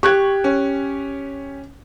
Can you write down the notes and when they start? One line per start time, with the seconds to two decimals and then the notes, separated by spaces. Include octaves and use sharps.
0.03 G4 C#6 F#6 G#6
0.44 C#4